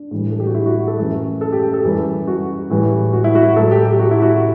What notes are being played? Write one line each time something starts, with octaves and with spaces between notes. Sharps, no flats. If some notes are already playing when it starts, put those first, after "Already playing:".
Already playing: D4
A2 E3 G3
A4
G4
F#4
E4
F#4
A4
F#2 E3 A3
A4
G4
G4
A4
F#2 E3 G3 G4
F#4
A2 E3 G3
F#4
E4
F#4
A2 F#3 A3 A4
G4
G4
F#4
E4
F#4